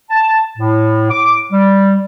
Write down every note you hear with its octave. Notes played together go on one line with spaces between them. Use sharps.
A5
A2
D6
G3